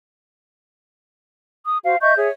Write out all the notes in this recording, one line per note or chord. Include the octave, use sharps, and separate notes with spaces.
D#6
F#4 C5 F5
D#5 E5 C#6 G6
G#4 C#5 E5